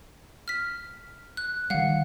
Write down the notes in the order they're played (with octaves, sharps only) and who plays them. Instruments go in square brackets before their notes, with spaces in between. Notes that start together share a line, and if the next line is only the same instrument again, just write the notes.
[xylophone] F6 B6
F#6
[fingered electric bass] D#3 G3 [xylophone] F5 F#5